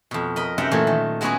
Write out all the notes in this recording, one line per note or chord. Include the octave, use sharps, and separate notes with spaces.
F2 B2
A#4 D#5 B5
F#2 C3 D#4 E5 F#5 G5
A#2 E3 F#3 A3
D#3
F#3 G#3 B3 C#4 F#4 G#4